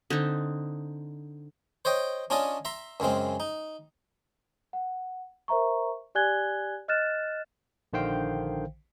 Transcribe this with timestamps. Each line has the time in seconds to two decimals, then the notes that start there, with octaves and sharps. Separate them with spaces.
0.10 D3 C4 D#4
1.85 C5 C#5 D#5 G5
2.30 C#4 D4 F4 C#5 D#5 A5
2.65 E5 A#5 C6
3.00 F#2 C#3 G#3 C4
3.40 D#4
4.73 F#5
5.48 A#4 C5 E5 A#5 C#6
6.15 G4 D5 G#5 F#6 G#6 G7
6.88 D#5 F6 F#6 A6 E7
7.93 A#1 D3 D#3 C5 F5 G5